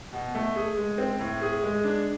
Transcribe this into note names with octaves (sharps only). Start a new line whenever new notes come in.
B2
A3
G#4
G#3
C4
A2
G#4
G#3
D4